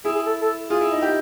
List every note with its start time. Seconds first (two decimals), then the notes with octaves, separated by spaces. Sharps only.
0.05 E4 G#4
0.15 G#4
0.27 A4
0.42 A4
0.70 F4 G#4
0.81 E4
0.91 D#4
1.02 G4